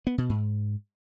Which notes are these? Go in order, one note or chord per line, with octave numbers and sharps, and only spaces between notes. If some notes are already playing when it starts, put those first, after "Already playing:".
B3
B2
G#2